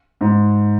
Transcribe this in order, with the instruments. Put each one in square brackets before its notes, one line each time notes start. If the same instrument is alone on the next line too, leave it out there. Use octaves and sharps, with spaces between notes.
[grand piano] G#2